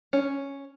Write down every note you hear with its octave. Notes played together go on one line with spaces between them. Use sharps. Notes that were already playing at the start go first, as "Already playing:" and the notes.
C#4